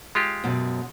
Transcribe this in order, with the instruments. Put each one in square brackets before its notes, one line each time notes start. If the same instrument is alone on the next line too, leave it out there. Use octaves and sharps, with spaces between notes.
[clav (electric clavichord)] G#3 F4 G4
[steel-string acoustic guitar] F#2 B2